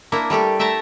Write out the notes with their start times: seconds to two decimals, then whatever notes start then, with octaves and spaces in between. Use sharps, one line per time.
0.12 A#3 D4 E4
0.30 G3 A3 G4 A4
0.59 A3 E5 G5 A5 A#5